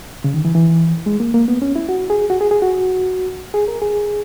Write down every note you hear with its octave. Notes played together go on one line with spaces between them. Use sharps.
C#3
D#3
E3
E3
G#3
A#3
A#3
B3
C#4
E4
F#4
G#4
F#4
G#4
G#4
F#4
G#4
A#4
G#4